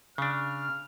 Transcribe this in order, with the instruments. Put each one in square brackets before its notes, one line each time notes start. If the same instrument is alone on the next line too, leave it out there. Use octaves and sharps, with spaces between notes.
[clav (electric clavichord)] C#3 D4 [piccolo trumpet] F6